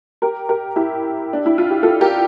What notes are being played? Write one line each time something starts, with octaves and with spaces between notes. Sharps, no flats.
G4 A#4
G4 A#4
E4 G4
D4
E4
F4
G4
F4 A4
G4 A#4